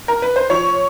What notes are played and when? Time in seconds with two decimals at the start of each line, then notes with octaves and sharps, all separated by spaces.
0.08 A#4
0.22 B4
0.36 C5
0.50 F3 C#5